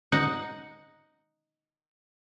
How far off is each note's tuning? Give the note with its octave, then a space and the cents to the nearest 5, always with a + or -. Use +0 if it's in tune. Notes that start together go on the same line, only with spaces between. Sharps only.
D#4 +0 F#5 +0